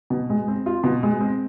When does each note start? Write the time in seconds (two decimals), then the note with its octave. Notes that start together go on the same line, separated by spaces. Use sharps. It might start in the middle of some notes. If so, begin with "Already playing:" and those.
0.10 B2
0.30 G#3
0.48 C4
0.66 F4
0.84 B2
1.03 G#3
1.20 C4